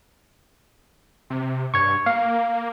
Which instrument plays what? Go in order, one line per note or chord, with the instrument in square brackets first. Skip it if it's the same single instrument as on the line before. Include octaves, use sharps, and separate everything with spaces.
[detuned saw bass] C3
[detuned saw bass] G2 [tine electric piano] C#6 G#6
[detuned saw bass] A#3 [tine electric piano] F5